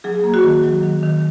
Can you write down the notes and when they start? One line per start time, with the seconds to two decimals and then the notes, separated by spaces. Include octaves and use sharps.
0.04 F#3 G#4
0.24 A#3
0.34 F#4
0.44 D#3
0.64 F#3
0.83 D#3
1.03 D#3